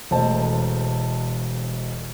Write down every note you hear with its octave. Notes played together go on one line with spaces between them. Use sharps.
E1 A3 C5 D#5 A5